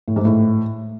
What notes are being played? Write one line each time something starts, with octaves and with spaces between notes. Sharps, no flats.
A2
G#2
A2